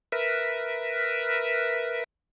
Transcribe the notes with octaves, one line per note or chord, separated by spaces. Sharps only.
A#4 B4 E5